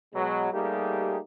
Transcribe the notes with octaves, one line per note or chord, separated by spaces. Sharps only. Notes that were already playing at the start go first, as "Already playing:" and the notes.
B2 F#3 G#3
G3 A3 A#3 D#4 G4 G#4